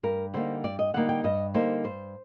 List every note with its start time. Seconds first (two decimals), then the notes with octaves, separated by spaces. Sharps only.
0.03 G2 A#4
0.34 D3 G3 A#3 D#4 C5
0.64 G2 D5
0.79 D#5
0.94 D3 G3 A#3 D#4 F#5
1.09 G5
1.24 G2 D#5
1.54 D3 G3 A#3 D#4 C5
1.84 G2 C5